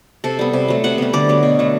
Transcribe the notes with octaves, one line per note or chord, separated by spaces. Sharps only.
C3 A4
G3 B3
C3
F#3 A3
C3 F#5
G3 B3
D3 D5
F#3 B3
B2
F#3 A3